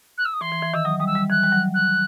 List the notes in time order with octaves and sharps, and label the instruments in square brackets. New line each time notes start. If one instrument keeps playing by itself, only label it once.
[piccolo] F#6
E6
D#6
[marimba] E3 [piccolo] C6
[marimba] E3
E3
[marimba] D#3 [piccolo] E6
[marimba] F#3 [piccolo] D#6
[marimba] G3 [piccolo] D#6
[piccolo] E6
[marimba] G3
[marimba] E3 [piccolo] F#6
[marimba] G3
F#3
[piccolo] F#6